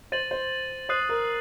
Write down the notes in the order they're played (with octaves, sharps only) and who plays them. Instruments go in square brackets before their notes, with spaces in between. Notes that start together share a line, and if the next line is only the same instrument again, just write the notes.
[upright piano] C5 [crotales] A6 D#7 F#7
[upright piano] C5
[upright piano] C5 [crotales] D#6 F#6 C7 D#7
[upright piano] A#4